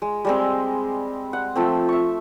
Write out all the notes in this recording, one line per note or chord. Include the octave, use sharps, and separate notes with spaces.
G#3
G3 G#3 C4
F#5
F3 A3 C4
E5 C#6